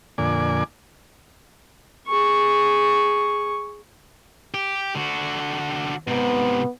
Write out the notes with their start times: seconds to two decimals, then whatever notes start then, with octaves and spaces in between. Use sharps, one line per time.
0.18 F2 A#2 D3 D5 G#5
2.07 G#4 C#6
4.54 G4
4.95 D3 F#4
6.08 G#2 C3 B3